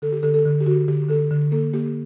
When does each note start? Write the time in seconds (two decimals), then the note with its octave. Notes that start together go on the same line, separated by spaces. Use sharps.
0.02 D3 A4
0.12 G4
0.23 D3 A4
0.34 A4
0.45 D3
0.61 G4
0.66 D3 F#4
0.88 D3 G4
1.09 D3 A4
1.31 D3
1.52 A#3 A4
1.73 A#3 G4